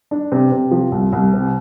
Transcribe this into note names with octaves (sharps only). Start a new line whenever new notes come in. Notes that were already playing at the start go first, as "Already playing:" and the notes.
D4
C3
C3
F3
C2
C2
C3